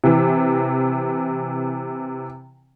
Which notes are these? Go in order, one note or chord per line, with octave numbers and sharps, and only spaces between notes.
C3 E3